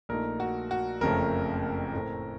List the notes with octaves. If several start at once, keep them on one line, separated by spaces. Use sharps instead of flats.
A#1 A#2 A3 D#4 A#4
F#4
F#4
F#1 F2 C#3 F3 A3 A#4
A2 A3 C4